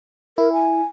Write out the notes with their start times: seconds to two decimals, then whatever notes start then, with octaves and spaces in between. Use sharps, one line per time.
0.38 E4 A#4
0.53 G#5